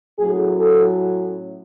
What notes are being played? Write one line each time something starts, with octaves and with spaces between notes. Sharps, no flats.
A2 F#3 C#4 G#4
A4